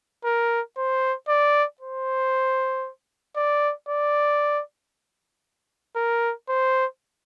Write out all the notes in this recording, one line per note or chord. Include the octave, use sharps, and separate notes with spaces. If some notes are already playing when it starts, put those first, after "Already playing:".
A#4
C5
D5
C5
D5
D5
A#4
C5